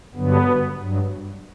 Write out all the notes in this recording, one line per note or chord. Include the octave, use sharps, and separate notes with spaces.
G2 D3 F#3 B3
G2 F#3